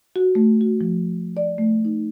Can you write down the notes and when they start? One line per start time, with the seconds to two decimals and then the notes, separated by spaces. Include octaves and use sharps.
0.16 F#4
0.35 A3
0.61 F#4
0.81 F3
1.37 D5
1.58 A3
1.85 D#4